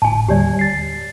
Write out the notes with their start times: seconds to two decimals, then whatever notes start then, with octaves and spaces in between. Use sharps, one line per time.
0.02 G1 A2 G#5 A5
0.28 D#2 D3 G3 G4 C#5 D5
0.59 A6 C7